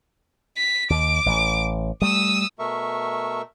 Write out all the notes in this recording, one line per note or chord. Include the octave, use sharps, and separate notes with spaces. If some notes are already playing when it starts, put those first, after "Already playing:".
B6
D#2 D6
A1
G3 A3 D#6 E6
B2 A3 A#4 E5 C#6